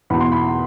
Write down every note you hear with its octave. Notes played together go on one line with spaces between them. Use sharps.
E2 B2 B5
C6
B5